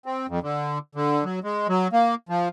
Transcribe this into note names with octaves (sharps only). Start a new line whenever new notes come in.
C4
F2
D3
D3
F#3
G#3
F#3
A#3
F3